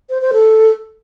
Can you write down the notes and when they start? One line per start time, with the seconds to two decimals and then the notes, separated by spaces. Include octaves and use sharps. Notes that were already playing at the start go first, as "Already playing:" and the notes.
0.10 C5
0.21 C5
0.33 A4